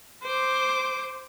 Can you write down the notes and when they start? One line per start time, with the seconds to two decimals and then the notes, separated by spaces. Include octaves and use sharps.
0.23 C5 D6